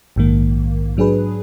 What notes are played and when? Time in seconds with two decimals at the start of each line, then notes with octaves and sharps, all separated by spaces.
0.16 A#1 G#2 D#3 A#3
0.97 G#2 F#3 D4 G#4 B4